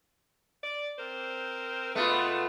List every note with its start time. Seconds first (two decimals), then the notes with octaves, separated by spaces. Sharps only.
0.63 D5
0.99 C4 A#4 C5
1.95 B2 G#3 A3 B3 F4 B4